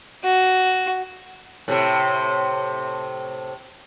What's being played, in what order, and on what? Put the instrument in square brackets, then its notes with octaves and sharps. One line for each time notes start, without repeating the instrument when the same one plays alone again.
[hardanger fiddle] F#4
[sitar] A2 C3